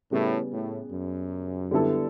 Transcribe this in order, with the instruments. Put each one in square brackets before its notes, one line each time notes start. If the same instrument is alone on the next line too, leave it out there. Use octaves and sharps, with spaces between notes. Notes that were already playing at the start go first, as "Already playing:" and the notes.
[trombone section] A2 [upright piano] C#3 G3 B3
[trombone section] A2
F#2
[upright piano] D3 G3 B3 E4 A4